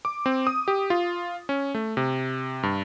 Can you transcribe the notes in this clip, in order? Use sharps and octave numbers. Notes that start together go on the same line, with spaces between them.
D6
C4
D#6
G4
F4
C#4
A3
C3
G2